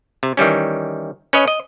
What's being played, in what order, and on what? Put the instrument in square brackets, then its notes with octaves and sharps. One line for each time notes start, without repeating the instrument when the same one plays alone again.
[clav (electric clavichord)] C3
D#3 E3 G3 C#4
C#4 B4 C#5 D#5
D#5